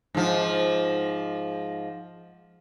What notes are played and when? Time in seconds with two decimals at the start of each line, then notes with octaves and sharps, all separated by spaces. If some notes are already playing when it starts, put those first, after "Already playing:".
0.15 G#2 F3